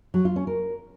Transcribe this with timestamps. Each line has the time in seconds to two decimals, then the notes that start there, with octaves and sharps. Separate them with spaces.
0.14 F#3
0.25 F4
0.36 C#4
0.47 A#4